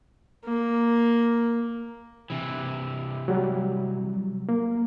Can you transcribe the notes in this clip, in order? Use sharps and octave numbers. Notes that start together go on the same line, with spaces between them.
A#3
C3 E3
F#3 G3
A#3